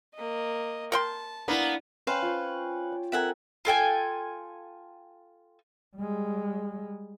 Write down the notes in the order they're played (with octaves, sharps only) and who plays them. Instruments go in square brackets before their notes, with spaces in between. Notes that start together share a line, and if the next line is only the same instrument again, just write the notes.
[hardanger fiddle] A#3 D#5
[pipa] A#4 G5 C6 [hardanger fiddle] A5
[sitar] A#3 B3 [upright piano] D4 E4
[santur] C#4 G5 [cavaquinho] B4 C5 F5
[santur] F4 C#5
D5
[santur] C4 A4 A#4 [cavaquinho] E5 F#5 G#5
[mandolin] F4 A4 G5 G#5
[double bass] G3 G#3